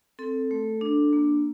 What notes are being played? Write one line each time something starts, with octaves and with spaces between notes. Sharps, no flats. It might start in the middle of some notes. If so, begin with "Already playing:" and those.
C4 A4
A3
D4
A#3